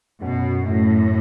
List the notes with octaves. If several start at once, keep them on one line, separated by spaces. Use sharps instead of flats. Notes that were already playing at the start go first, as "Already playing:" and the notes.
F#2 B2
F#2 A2